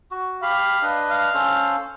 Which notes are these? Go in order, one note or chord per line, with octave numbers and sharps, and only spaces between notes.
F#4
G4 F5 B5
D4 B4 D#5
F5
C#4 A4 C5